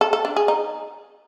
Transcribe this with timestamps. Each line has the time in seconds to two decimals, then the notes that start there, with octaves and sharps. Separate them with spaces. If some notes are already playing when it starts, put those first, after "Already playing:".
0.01 A4
0.13 A4
0.25 D4
0.36 G#4
0.48 D#4